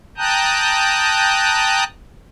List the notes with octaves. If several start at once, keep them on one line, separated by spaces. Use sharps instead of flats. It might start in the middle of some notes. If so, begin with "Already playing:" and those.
G5 A5 A#5 D#6 F#6 G6